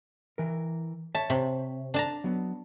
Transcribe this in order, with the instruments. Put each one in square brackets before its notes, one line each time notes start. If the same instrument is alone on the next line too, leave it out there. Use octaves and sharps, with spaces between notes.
[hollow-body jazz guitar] E3 A#4
[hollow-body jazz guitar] C#5 E5 [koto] A5
[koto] C3
D4 A5 A#5
[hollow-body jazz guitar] F#3 B3